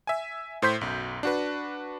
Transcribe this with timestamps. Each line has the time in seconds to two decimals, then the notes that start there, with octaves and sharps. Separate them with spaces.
0.07 E5 G#5
0.62 A2 C5 C6 G6 B6
0.81 B1 F#2
1.23 D4 F#4 B4